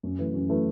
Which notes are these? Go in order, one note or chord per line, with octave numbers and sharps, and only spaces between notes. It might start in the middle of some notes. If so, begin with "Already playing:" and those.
F#2
E3 A3 E4 B4
F#2
E3 A3 E4 B4